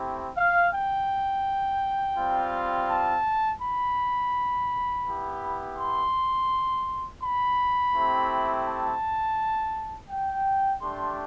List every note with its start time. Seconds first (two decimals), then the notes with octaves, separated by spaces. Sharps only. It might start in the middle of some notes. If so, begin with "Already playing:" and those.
Already playing: A3 C4 E4 G4
0.36 F5
0.72 G5
2.17 G3 C4 F4
2.89 A5
3.61 B5
5.06 B3 E4 G4
5.77 C6
7.22 B5
7.94 A3 C4 E4 G4
8.66 A5
10.09 G5
10.81 A3 D4 G4 C6